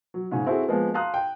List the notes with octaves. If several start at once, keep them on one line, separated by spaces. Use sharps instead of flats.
F#3
G#2 C#3 C#4
C4 E4 F#4 G#4 A4
F3 G#3 A#3 B3
F5 A5 A#5 C6 D#6 F#6
G5